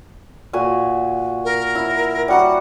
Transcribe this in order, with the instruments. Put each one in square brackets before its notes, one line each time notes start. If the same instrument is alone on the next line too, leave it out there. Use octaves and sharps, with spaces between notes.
[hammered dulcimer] A#2 F#4 G#5
[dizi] A#4
[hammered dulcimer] E4
[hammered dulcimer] G3 F#4 A#5 [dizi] F#5